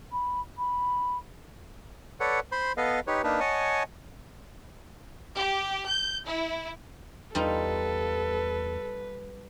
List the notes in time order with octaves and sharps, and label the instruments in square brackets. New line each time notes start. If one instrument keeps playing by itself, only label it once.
[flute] B5
B5
[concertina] A4 B4 C#5 D5 F#5
C5 B5 C6
B3 A4 B4 D#5 F5
D#4 G4 B4 C#5
A#3 D4 D#4 B4
C#5 D#5 F#5 G#5 A5
[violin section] G4
G6
E4
[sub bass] E2 [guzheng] G3 D#4 F4 [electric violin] A4 [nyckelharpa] B4